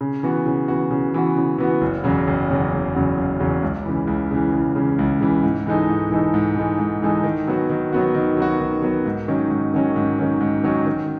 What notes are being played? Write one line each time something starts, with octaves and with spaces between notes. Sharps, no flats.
C#3
E3 B3 F#4
C#3
E3 B3 F#4
C#3
E3 B3 F#4
C#3
E3 B3 F#4
F#1
E2 C#3 F#3
F#1
E2 C#3 F#3
F#1
E2 C#3 F#3
F#1
E2 C#3 F#3
C#2
C#3 E3
C#2
C#3 E3
C#2
C#3 E3
C#2
C#3 E3
G#2
E3 G#3 D#4 A4
G#2
E3 G#3 D#4 A4
G#2
E3 G#3 D#4 A4
G#2
E3 G#3 D#4 A4
D#3
F#3 B3 F#4
D#3
F#3 B3 F#4
D#3
F#3 B3 F#4
D#3
F#3 B3 F#4
G#2
D#3 F#3 C#4
G#2
D#3 F#3 C#4
G#2
D#3 F#3 C#4
G#2
D#3 F#3 C#4
D#3